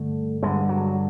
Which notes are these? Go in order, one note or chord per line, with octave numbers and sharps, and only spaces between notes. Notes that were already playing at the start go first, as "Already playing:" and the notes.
Already playing: G2 D3 A3
G2 D3 G#3
F#3